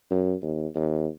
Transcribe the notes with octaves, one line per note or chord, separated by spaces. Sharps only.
F#2
D#2
D#2